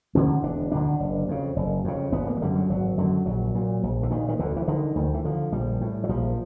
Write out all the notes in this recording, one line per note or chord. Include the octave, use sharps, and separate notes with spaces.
D2 D3 C#4
E1 D4
D2 D3 D4
F#1
F2 C#3
F#1
F2 C#3
G#1 B3
A#3
F#3
F#2 D3 G3
F#3
G#1 F#3
F#2 D3 F#3
A#1 F#3
A#2
A#1
D3
A#2 D#3
D#3
D2 D3
E3
D3 D#3
D2 D#3
E3
D3 F3
A#1 G3
A2
F#3
A#1 F3